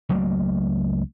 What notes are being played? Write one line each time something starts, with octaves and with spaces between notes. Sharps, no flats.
C#2 F#3 A3 A#3